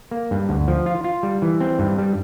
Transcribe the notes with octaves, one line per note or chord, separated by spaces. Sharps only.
A#3
G2
D2
F3
F4
F4
G3
E3
C4
G2
G3